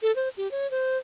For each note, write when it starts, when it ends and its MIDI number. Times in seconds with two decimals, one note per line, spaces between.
0.02 0.14 69
0.16 0.29 72
0.37 0.50 67
0.51 0.69 73
0.71 0.98 72